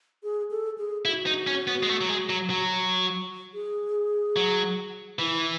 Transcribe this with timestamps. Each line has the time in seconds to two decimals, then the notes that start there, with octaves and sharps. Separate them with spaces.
0.23 G#4
0.51 A4
0.78 G#4
1.05 E4 F#4
1.26 D#4
1.47 C#4
1.68 B3
1.83 G#3
1.89 A3
2.01 F#3
2.09 G#3
2.30 F#3
2.50 F#3
3.54 G#4
4.36 F#3
5.19 E3 E4